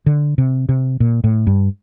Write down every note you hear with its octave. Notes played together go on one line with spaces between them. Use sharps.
D3
C3
C3
A#2
A2
G2